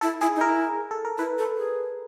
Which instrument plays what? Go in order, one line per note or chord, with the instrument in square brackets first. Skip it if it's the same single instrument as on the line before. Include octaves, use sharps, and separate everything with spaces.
[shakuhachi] E4 [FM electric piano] A4
[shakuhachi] E4 [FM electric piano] G#4
[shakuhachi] D#4
[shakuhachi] E4 [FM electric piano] A#4
[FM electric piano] A4
A#4
[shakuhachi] E4 [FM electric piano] B4
[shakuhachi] A4
G#4